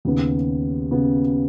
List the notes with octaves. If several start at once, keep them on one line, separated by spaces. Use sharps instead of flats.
D#2 C#3 B3
C#3 B3